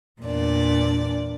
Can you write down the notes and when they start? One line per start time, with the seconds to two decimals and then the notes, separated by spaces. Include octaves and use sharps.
0.21 E2 A#2 D4 D5